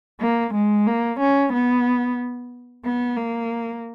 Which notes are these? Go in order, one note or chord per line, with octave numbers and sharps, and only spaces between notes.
A#3
G#3
A#3
C#4
B3
B3
A#3